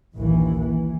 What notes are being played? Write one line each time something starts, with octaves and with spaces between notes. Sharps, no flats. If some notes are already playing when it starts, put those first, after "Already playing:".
A#1 D#2 E3
E3